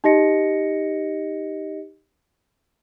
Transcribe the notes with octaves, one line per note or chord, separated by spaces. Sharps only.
D#4 G4 D#5 A#6 C#7